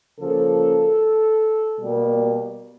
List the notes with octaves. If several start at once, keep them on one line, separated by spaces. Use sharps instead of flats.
C#3 F3 A#3 A4
B2 G3 A#3